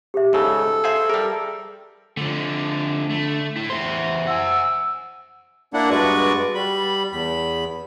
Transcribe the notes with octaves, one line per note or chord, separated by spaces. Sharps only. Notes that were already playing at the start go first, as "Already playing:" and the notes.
G4 G#4 E5
G#2 C#3 A4
G#4 C5 E5 F5 G#5 B5
G3 G#4 A#4
D3 F3 A3
A3
A2 E4
E2 C5 E5 C6
F#5 G#5 E6
A#3 D4 E4 F#5
G2 G#3 F#4 B4 D5 C#6
G3 B5
E2 B5